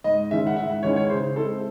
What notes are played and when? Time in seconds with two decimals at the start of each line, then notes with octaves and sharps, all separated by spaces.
0.04 G#2 D#5
0.31 D#3 G#3 C#4 E4 E5
0.47 F#5
0.56 G#2 E5
0.70 F#5
0.83 D#3 G#3 C#4 E4 C#5
0.96 C#5
1.09 C#3 C5
1.35 G#3 C4 E4 A4